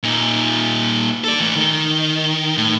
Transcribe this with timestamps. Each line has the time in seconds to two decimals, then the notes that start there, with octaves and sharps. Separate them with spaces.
0.03 A#2 D#4
1.24 A4 D5
1.40 E3 A3
1.56 D#3
2.58 A2